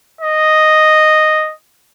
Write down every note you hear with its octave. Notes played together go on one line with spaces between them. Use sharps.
D#5